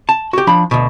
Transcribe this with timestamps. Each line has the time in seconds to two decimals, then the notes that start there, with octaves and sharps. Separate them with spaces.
0.09 A5
0.33 F#4 G4
0.47 F3 D4 B5
0.71 D2 B2